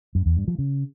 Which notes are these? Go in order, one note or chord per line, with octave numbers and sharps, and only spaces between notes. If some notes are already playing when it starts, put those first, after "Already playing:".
F#2
E2
G2
F3
C#3